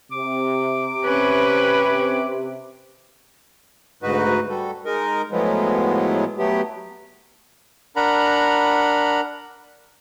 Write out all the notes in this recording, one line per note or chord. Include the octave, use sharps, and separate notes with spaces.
C3 D6
C#4 B4
D2 G#2 D#4 F#4 B4
G3 F#4 A4
G#3 D#4 A#4
A2 F3 F#3 G#3 B3
F#3 A3 B3 G4
D4 A#4 F#5 A#5 B5